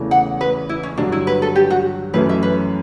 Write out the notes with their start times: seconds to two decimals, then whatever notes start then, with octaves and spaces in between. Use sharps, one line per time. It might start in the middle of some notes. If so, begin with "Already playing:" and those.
Already playing: E2 C#3 E3 A3
0.11 F#5
0.41 B4
0.69 E4
0.83 C#4
0.97 G2 D3 F#3 D4
1.12 E4
1.27 B4
1.42 A4
1.56 G4
1.70 F#4
2.14 F#2 E3 A3 C#4 E4 B4
2.29 E5
2.43 B4